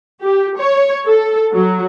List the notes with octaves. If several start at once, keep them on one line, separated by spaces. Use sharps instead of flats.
G4
C#5
A4
F#3